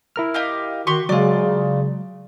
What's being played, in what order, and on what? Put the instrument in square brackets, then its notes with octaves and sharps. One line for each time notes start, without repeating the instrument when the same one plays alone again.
[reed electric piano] E4 A#4 F6
[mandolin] G4 D#5 F5
[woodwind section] D#3 F#4 [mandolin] G4 C6 C#6
[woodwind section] C#3 [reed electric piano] F#3 G#3 [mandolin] F4 D5